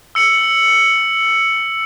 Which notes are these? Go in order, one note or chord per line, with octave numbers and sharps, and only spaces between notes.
E6 C#7 F#7